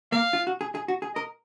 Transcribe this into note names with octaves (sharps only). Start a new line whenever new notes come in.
A#3 F5
F4
F#4
G#4
G#4
F#4
G#4
A#4 D#5